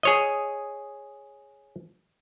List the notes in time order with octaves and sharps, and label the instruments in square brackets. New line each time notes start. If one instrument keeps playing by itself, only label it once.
[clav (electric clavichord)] G#4 C#5 D#5